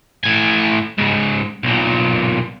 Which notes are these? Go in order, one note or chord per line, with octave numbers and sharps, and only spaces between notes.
A2 G#5
G#2 C#3
B1 A#2